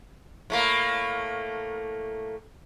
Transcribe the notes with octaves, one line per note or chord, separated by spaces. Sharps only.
A2 A3 A#3